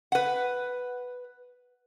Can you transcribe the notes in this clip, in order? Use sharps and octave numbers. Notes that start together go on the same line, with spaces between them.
B4 F#5